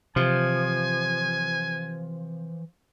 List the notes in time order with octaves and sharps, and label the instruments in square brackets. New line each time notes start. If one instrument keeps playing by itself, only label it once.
[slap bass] C3 [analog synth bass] E3 [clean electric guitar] F3 [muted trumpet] G#5